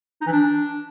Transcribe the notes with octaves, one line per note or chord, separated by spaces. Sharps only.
D#4
E3
D4